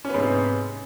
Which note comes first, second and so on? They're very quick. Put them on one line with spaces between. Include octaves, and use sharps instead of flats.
C#4 B3 G#2 C3